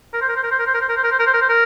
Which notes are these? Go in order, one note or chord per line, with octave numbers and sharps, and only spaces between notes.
A#4
C5
A#4
C5
A#4
C5
A#4
C5
A#4
C5
A#4
C5
A#4
C5
A#4
C5
A#4
C5
A#4